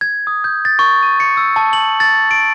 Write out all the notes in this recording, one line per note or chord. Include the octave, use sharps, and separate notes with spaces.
G#6
D#6
G6
A6
C#6
D#7
C#7
E6
A5
F#7
A6
D7